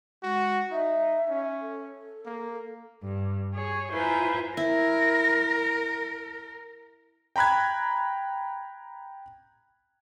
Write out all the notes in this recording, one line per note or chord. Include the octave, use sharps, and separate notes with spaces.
G#3 F#4
D#4 E5
C#4
A4
A#3
G2
G#4 C#5
E4 F4 B4 C5 G#5 A#5
E4 A#4
G5 A#5 B5 F#6 G#6